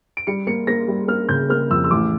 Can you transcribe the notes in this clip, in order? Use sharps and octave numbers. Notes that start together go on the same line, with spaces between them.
D7
G3 C#7
A#3 C#7
A#3 A#6
G3
A#3 F6
C#3 G6
A#3 F6
F2 E6
E6
A1 D6